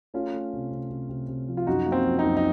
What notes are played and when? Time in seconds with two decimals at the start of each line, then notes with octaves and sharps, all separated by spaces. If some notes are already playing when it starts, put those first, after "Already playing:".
0.14 A3 C#4 F4
0.34 A3
0.53 C3
0.71 C3
0.90 C3
1.09 C3
1.28 C3
1.48 F3
1.57 F4
1.67 F#2 D#4 F#4
1.86 A#3
1.92 C4
2.05 F3
2.18 C4 D#4
2.25 F#2
2.37 D#4